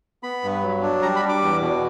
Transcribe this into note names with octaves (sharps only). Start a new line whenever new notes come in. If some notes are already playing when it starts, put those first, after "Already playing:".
B3 B5
G2
F#3
D4
G3 A#5
B5
G3
D6
E2
B2